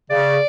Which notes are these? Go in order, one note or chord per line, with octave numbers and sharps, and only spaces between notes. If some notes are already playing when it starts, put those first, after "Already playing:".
C#3 D5